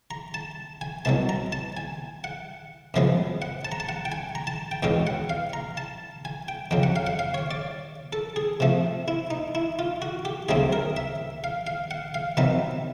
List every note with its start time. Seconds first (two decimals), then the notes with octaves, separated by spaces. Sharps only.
0.11 A#5
0.34 A5
0.81 G#5
1.05 C2 B2 F#3 A5
1.29 A#5
1.52 A5
1.77 G#5
2.24 F#5
2.94 F#2 C#3 F3 G#3 B3
3.42 F#5
3.65 A5
3.72 A#5
3.80 A5
3.89 F#5
4.05 G5
4.12 G#5
4.35 A#5
4.47 A5
4.71 G5
4.83 E2 B2 G#3 C#4 G5
5.07 F#5
5.30 F5
5.53 A#5
5.77 A5
6.25 G#5
6.48 G5
6.71 F2 C#3 F#3 G5
6.83 F#5
6.96 F5
7.07 F#5
7.19 F5
7.34 C#5
7.51 D5
8.13 A4
8.36 G#4
8.60 C3 F3 A3
9.08 E4
9.31 D#4
9.55 E4
9.79 F4
10.02 F#4
10.25 G4
10.49 D2 C#3 F#3 A3 C4 G#4
10.73 A#4
10.97 E5
11.44 F5
11.67 F5
11.91 F#5
12.14 F5
12.37 C3 D#3 F#3 B3 D#4 E5